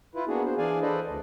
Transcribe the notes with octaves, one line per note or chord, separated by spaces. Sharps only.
E4 F4 B4
A#3 B3 D4 F#4 G#4
C5
E3 D4 G#4 D5 F5 G#5
A4 B4 C5 D5 D#5
D2